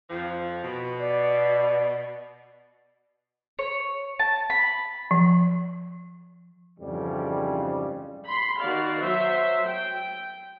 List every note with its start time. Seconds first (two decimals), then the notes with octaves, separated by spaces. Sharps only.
0.10 F2 F3
0.63 B2
1.00 D5
3.59 C#5
4.19 A5
4.50 B5
5.11 F3
6.79 F2 G#2 C#3 E3 G3
8.26 B5 C6
8.59 D#3 F#4 D5 F5
9.00 F#3 C5 E5
9.66 G5